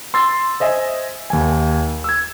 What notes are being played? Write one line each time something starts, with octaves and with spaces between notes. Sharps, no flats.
C6 E6 A6
C5 D#5 E5 G#5
D#2 G#5
E6 G#6